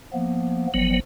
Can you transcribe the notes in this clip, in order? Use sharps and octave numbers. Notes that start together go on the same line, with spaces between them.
F3 A#3 B3
G1 F3 F#3 B3